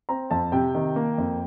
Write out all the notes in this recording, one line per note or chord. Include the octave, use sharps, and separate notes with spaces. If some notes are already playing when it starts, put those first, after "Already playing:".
C4 A#5
F2 A5
C3 G5
D#3
A#3
F2